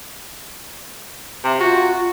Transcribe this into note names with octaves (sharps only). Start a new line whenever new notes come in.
C3 E5
F4 F#4